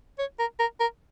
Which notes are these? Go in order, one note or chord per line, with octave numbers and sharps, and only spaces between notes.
C#5
A#4
A#4
A#4